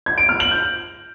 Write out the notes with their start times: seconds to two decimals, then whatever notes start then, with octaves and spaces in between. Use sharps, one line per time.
0.06 G#6
0.18 D7
0.29 F6
0.40 F#7
0.51 G6